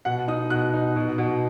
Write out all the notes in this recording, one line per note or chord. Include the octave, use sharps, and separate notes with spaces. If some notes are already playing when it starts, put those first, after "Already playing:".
B2 F#5
D#4 D#6
B2 F#6
D#4
B2
B2